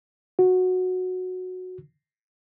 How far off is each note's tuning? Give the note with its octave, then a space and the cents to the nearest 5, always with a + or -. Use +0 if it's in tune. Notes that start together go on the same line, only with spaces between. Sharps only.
F#4 -10